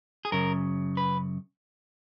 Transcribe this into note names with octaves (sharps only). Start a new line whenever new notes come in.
G#4
F#2 C#3 A#4
B4